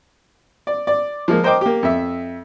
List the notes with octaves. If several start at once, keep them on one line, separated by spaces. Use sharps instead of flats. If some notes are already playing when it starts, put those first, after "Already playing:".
D5
D5
F3 G#3 A#3
A#4 C5 D#5 G5 D6
A#3 G4
F2 E5